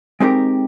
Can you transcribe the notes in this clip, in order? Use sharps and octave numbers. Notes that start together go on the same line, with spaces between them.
G#3 C4 D#4 G4 A#4